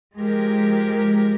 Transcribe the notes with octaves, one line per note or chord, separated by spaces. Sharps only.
F3 G#3 G4 A#4